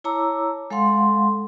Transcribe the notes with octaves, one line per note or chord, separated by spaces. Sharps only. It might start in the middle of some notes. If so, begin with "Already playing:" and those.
E4 C#5 A5 A#5 D6 E6
G#3 A4 F5 F#5 C6